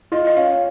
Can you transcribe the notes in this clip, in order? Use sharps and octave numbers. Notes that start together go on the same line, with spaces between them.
F4 D#5
D#5
C#4 F5